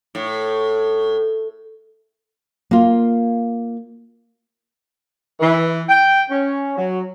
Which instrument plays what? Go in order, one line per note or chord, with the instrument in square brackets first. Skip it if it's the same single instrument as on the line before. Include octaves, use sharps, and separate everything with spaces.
[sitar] A2
[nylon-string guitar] A#3 F4
[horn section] E3
G5
C#4
F#3